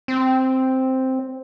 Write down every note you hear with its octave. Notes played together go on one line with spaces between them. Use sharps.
C4